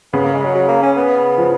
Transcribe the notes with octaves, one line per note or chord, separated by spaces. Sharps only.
C#3 B3
A#3
G#3
F#3
F#3
A#3
C#4
B3
F3